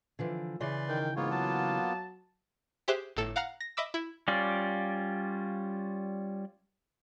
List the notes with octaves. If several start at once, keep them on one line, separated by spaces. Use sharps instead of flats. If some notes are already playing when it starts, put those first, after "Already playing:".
D3 E3 F3
C#3 E3 B4 D5 C6
D#3 G5
G#2 A#3 B3 F4 C#5
F#3 A5
G4 G#4 C5 E5 D6 F#6
G1 A2 A4 E7
F5 F#5 A#5 F6
A#6
D#5 E5 B5 D6 E6
E4
G3 C#4 F4 D5